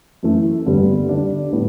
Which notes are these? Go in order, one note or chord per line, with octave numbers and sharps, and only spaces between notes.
F#2 E3 A3
G2 D3 G3 B3
D3 G3 D4
A2 G3 B3